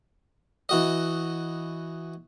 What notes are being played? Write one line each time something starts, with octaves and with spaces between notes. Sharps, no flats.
E3 F#4 D#5